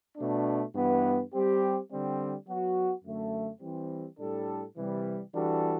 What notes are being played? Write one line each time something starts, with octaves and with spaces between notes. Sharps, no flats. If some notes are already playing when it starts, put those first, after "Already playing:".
B2 A3 D4
G2 E3 B3
G3 C4 G4
D3 G3 C4
F#3 B3 F#4
F#2 D3 A3
E3 G3 C4
A2 G3 D4 A4
C3 E3 G3
E3 G3 D4 F#4 A4